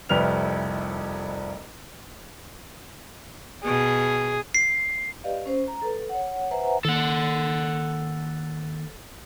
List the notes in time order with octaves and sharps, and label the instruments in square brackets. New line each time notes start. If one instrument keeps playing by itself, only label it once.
[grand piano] F1 C2 F2 B4 F6 F7
[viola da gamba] B2 [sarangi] G#4
[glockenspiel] C7
[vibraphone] G4 B4 D5 D#5 F5
C#4 C5
A#5
A4 B4
C#5 F#5
B4 C5 E5 F#5 G#5 A#5
[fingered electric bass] D#3 A#3 [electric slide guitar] A4 F#5